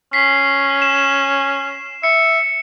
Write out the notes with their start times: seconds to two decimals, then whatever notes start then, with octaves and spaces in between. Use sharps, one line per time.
0.13 C#4 B6 C7
0.82 E7
2.03 E5 C#7